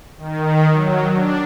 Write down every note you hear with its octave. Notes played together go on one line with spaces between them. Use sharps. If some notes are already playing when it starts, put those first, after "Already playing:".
D#3
F#3
D4